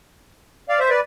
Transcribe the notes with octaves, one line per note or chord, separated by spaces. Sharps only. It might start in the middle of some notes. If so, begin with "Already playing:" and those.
D5 F5
C5 E5
B4 D5